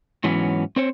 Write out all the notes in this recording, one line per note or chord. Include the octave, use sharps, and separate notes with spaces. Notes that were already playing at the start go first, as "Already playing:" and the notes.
G#2 E3 F#3 B3 C#4
C4 C5 C#5